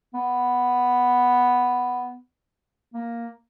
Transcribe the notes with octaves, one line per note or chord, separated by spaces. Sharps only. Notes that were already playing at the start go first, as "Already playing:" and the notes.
B3
A#3